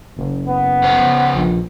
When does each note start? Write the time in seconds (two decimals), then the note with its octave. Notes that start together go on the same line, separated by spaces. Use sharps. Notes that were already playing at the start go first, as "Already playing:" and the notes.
0.17 F#1
0.48 B3
0.83 C#3 C5
1.34 A#1